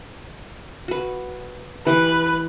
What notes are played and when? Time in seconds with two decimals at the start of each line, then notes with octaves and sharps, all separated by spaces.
0.88 F#4 B4
1.87 E3 G4 B4